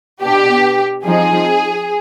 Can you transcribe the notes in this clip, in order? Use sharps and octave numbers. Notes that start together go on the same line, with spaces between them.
B2 B3 D4 G4
F3 C4 D#4 G#4